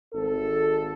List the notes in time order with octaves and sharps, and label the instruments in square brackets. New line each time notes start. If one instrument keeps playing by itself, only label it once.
[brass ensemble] G#1 A4